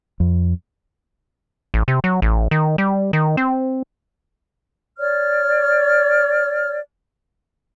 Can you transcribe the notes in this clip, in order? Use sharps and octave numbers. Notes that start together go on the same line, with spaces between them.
F2
A1
C3
F#3
A1
D#3
G3
D#3
C4
C#5 D5 F6